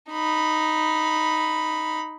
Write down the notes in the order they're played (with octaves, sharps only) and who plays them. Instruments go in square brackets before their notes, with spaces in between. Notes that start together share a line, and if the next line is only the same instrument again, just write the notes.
[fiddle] D#4 B5